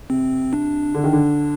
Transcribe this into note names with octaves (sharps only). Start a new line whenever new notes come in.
C3 C4
D4
D3
D#3
D3